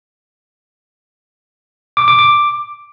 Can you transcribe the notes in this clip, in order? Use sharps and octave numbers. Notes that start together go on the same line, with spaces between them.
D6
D6
D6